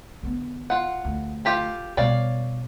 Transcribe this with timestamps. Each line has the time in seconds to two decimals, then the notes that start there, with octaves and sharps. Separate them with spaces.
0.23 D3 B3
0.70 F4 F#5
1.05 D2
1.45 F4 G4 A4
1.97 B2 G3 C#5 D5 F5